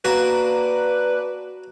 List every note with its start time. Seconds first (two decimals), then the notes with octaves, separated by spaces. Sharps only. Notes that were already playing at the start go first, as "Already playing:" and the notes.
0.05 A#3 D4 F#4 B4